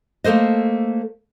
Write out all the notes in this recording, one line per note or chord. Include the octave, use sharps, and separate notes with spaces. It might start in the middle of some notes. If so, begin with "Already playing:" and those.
A3 A#3 A4 C5 D#5